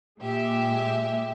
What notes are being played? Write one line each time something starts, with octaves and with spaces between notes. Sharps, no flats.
A#2 G#3 G4 E5